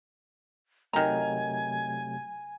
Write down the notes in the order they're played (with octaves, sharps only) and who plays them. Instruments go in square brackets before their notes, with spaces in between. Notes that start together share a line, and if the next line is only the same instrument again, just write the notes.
[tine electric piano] C3 F#3 A3 [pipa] D#3 A#5 [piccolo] G#5